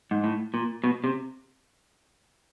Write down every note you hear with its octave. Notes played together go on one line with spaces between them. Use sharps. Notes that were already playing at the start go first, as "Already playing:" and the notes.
G#2
A2
A#2
B2
C3